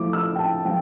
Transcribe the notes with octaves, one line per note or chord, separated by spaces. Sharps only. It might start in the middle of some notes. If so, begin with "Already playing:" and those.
Already playing: F3 A3 E4 D6
E6
G5
A5
F3 G5